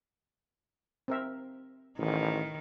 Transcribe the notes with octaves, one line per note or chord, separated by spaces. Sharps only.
C4 A#4 E5
A1 D#3